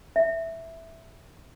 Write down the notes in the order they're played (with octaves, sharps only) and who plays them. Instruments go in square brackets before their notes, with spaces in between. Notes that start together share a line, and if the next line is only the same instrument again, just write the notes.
[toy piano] E5